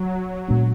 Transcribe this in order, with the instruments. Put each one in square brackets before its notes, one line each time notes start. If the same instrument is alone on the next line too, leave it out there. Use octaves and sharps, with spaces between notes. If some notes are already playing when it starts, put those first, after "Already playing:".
Already playing: [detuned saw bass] F#3
[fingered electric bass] A#2 G#3 B3 D4